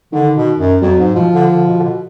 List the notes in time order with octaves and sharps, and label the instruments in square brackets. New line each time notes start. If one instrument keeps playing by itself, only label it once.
[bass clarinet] D3 [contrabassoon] D#3
[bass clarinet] B2
F#2
[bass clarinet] F2 [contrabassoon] F#3
[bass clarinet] G#2
[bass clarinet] B2 [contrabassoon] F3
[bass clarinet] D3
D3
B2
D3
B2